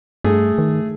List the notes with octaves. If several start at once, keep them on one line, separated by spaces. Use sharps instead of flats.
G2 A3 G#4
D#3